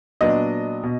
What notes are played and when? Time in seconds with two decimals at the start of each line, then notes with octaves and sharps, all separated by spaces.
0.21 A#2 F#3 B3 D4 D#5
0.83 B2